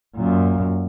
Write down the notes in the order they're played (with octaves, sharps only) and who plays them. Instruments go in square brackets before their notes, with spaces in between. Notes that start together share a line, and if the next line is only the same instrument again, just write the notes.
[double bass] F#2 A#2